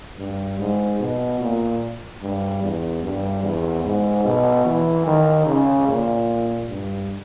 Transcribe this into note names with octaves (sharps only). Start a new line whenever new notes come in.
G2
G#2
B2
A#2
G2
E2
G2
E2
G#2
B2
E3
D#3
C#3
A#2
G2